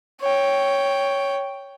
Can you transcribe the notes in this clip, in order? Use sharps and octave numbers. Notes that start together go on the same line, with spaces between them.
C#5 G5